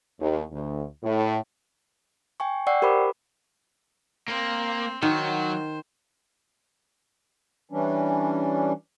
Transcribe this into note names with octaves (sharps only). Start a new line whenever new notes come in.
D#2
D2
A2
G5 G#5 C#6
D5 F#5 G5 C#6 E6 C7
G4 A#4 C5 B5 D6
A#3 C4
D#3 F#3 F#4 C5
E3 G3 C#4 D4